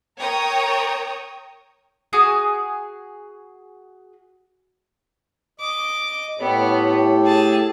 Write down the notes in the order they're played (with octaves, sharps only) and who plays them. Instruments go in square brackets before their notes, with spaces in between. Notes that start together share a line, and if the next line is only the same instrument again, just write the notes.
[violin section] A#4 C#5 G5 A#5 C#6 D#6
[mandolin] F#4 G#4 G#5 D#6
[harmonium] D#5 [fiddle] D6
[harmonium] A2 G4 A4 [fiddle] B3 [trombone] C#5
[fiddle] G#4 A5